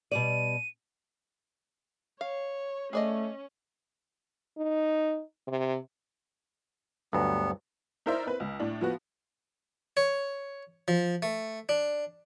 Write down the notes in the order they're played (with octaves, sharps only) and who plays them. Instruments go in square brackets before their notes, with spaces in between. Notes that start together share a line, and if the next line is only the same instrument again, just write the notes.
[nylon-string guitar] B2 G3 D5 [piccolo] D#7
[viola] C#5 [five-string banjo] F5
[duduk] A3 [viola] C#4 [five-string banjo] G#4 D5 D#5
[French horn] D#4
C3
[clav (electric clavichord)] D2 G2 F#3 [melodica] B3
[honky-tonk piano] D#4 E4 A#4 C5 D5 E5
C4 B4
C#2
A2 D4
F3 B3 F#4
[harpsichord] C#5
F3
A3
D4